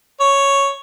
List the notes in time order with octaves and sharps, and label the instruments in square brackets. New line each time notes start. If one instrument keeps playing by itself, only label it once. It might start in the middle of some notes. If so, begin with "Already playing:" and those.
[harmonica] C#5